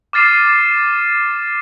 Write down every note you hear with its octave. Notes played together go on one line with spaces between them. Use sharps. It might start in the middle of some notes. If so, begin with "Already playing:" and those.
D6 F6 A6 C7 D#7 E7